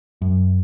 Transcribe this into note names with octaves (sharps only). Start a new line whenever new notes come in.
F#2